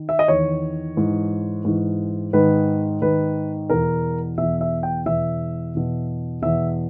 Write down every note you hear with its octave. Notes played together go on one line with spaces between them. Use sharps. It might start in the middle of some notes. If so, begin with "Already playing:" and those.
Already playing: D#3
E5
D#5
E2 D#3 C#5
G#2 E3
G#2 E3
G#2 D#3 B4
G#2 D#3 B4
E2 B2 A#4
E2 B2 E5
E5
G5
E2 B2 E5
E2 B2
E2 B2 E5